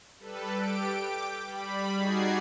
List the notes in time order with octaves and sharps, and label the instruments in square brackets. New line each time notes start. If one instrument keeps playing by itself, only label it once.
[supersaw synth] G3 A4 B4
G4 D7
G5 D6
G3 B5
D#4 F#4 G#4 D5 G#6 C7